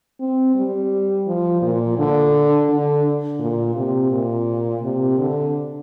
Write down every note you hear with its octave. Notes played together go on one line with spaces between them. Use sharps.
C4
G3
F3
A#2
D3
D3
A#2
C3
A#2
C3
D3